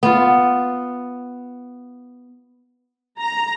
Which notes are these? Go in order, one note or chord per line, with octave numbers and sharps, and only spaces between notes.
B3 F4
A#5